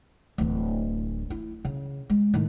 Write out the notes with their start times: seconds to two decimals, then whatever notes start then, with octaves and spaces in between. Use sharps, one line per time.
0.38 D1 E3
1.30 E4
1.64 C#3
2.09 G#3
2.34 A2 D#3